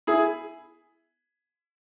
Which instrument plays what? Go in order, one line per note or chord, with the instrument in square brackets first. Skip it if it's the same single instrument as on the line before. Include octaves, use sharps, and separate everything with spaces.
[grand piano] E4 G#4